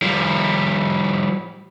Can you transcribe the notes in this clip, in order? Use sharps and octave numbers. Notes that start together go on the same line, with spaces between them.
F3 G3